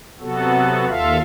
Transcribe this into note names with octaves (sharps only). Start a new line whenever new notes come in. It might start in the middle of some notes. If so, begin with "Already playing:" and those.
C3 F#3 B3 F#4 A4
D#2 F4 A4 E5 F5